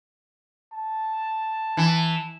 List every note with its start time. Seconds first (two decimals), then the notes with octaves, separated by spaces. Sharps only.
0.73 A5
1.77 E3